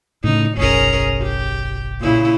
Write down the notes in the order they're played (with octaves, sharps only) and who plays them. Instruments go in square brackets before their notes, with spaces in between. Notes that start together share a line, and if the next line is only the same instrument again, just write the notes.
[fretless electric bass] A2 C#3 [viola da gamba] D#4
[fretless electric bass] F#1 B1 [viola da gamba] C#4 G#4 A#4
[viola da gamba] G4
A#2 C#3 E4